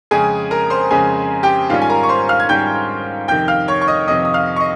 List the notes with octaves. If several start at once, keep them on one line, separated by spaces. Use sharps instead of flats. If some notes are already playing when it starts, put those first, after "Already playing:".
F2 C#3 G#3 C#4 G#4 G#5
A#4 A#5
C5 C6
F2 C#3 G#3 C#4 G#4 G#5
G4 G5
G#2 D#3 G3 C#4 F4 F5
G#5
A#4 A#5
C#6
C5 C6
F5 F6
G#6
G#2 D#3 G3 C#4 G5 G6
F2 C3 D#3 G5 G6
F5 F6
C#5 C#6
C#6
D#5 D#6
F2 C3 D#3 D#5 D#6
D#6
F5 F6
C#6
D#5